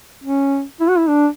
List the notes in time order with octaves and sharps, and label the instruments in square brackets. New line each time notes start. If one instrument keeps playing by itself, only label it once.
[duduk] C#4
E4
F#4
E4
D4